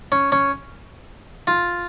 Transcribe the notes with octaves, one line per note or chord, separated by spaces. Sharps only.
C#4
C#4
F4